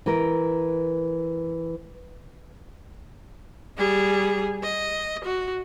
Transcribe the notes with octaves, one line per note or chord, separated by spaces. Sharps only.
E3 A#4
G3 G#4
D#5
F#4